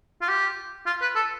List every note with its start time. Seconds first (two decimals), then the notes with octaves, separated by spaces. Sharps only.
0.21 F4
0.29 G4
0.87 F4
1.01 B4
1.15 A4